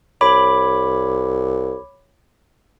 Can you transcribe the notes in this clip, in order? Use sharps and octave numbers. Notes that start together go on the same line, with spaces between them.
C2 C#5 B5 D6